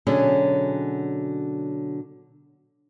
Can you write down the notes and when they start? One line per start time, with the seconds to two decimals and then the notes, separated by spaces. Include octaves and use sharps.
0.07 B2 D3 F#3 C#4 G#4